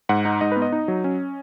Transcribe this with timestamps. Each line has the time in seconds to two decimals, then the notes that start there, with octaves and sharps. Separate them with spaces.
0.09 G#2 F#5
0.25 D#4
0.41 G#2 D#5
0.52 B3 B4
0.62 D#5
0.72 D#4
0.88 F#3
1.04 C#4